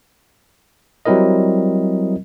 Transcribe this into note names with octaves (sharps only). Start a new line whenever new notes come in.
F#3 G3 C4 E4 A#4 D#5